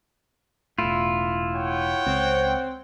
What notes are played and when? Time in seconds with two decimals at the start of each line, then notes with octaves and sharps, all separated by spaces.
0.78 E1 A2 E4 F4
1.55 C#5 F#5 G5
2.06 C#2 C4